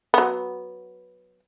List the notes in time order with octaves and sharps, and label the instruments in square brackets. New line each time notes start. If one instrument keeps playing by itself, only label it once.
[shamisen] F#3 B3